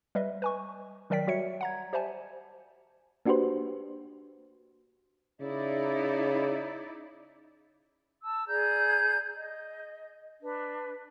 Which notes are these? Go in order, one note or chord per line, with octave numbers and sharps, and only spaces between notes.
G3 B4 D#5 E5
B4 G#5 C#6
D#3 F#3 A#4 D5 G5 B6
G3 F#4 C#5 E5 C#7
F#5 A#5 G#6
G4 C5 D5 E5 G#5 A5
A#3 D4 F#4 G4 B4 C5
C#3 D#4 E4 D5
A5 E6
G#4 D5 A#5 G6
D#5
D4 B4